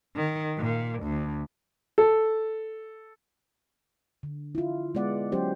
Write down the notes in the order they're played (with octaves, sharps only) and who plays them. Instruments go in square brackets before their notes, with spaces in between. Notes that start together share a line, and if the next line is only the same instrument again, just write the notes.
[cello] D#3
A#2
D2
[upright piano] A4
[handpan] D3
E4 F4
G#3 B3 D5 F#5
F#3 C#4 G4 C5